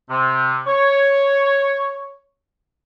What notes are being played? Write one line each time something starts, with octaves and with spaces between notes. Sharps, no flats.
C3
C#5